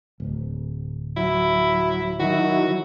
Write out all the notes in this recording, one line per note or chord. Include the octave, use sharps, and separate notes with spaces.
D1
F#3 E4
D#3 F#3 E4 F#4